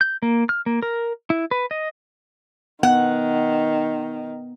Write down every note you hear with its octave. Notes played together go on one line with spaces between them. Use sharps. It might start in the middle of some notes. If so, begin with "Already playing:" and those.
G6
A#3
F6
A#3
A#4
E4
B4
D#5
D#3 B3 F#5